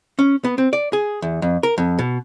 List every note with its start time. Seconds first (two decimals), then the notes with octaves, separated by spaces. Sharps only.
0.19 C#4
0.44 B3
0.58 C4
0.73 D5
0.93 G#4
1.22 E2
1.42 F2
1.63 A#4
1.78 F2
1.99 B2